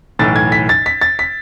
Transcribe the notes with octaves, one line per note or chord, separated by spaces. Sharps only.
B1 A2 E3 A6
G#6
B6
A6
B6
A6
B6